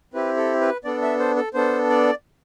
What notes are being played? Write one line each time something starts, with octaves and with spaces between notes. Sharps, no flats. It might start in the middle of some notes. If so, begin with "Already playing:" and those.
C4 E4 G4 B4
A4
B4
B3 D4 A4 D5
E5
C5
A4
B3 D4 A4 C5
D5